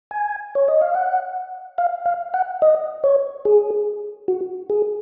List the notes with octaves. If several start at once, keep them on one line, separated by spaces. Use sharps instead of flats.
G#5
C#5
D#5
F5
F#5
F5
F5
F#5
D#5
C#5
G#4
F#4
G#4